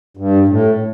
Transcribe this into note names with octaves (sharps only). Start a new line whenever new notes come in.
G2
A2